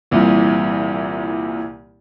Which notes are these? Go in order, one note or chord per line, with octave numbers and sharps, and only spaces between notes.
C2 A#2 E3